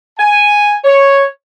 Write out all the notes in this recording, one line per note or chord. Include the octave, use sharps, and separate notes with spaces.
G#5
C#5